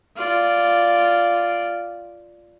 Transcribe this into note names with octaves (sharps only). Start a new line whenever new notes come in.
F4 D5